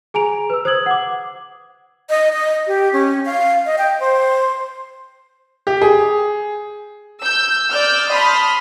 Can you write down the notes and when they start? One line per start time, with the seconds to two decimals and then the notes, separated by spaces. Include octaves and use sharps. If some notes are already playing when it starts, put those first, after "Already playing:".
0.14 G#4 G#5 A#5 D7 F7
0.50 B4 E6
0.65 C5 D#6 G#6 F#7
0.86 F#5 D6
2.10 D#5
2.33 D#5
2.67 G4
2.93 C#4
3.25 F5
3.66 D#5
3.78 G5
4.00 C5
5.67 G4
5.81 G#4
7.21 E6 G6
7.70 D5 E6 F6 G6
8.08 A5 B5 C6 D#6 F6